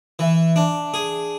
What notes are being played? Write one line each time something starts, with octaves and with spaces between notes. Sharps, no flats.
E3
D4
G#4